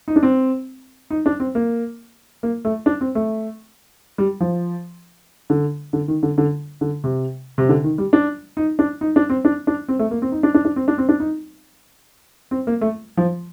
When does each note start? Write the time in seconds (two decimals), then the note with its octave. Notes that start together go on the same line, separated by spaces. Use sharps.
0.08 D#4
0.16 D4
0.23 C4
1.10 D#4
1.26 D4
1.40 C4
1.55 A#3
2.43 A#3
2.65 A3
2.86 D4
3.01 C4
3.15 A3
4.18 G3
4.40 F3
5.50 D3
5.93 D3
6.08 D#3
6.23 D3
6.38 D3
6.81 D3
7.04 C3
7.58 C3
7.69 D3
7.84 D#3
7.98 G3
8.13 D4
8.57 D#4
8.79 D4
9.01 D#4
9.16 D4
9.29 C4
9.45 D4
9.67 D4
9.88 C4
9.99 A3
10.11 A#3
10.22 C4
10.32 D#4
10.43 D4
10.54 D4
10.65 D4
10.76 C4
10.88 D4
10.98 C4
11.09 D4
11.20 D#4
12.51 C4
12.67 A#3
12.81 A3
13.17 F3